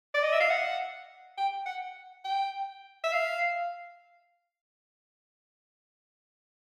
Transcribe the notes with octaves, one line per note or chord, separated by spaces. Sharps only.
D5
D#5
E5
F5
F#5
G5
F#5
G5
E5
F5